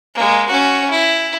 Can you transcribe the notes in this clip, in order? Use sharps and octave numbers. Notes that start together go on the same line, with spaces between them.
G#3 A#3
C#4 F#4
E4